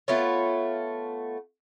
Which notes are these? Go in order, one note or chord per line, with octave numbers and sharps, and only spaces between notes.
A3 B3 F4 C#5